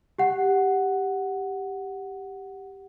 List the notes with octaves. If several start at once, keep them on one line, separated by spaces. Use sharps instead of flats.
G4 F#5